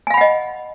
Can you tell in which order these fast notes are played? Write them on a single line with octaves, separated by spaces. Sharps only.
G#5 F5 B5 F#5 D#5